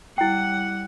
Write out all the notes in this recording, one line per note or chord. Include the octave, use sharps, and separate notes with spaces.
G3 E4 F#5 G5